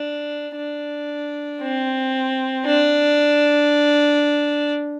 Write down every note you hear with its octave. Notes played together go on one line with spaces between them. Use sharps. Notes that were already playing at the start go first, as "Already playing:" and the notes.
Already playing: D4
D4
C4
D4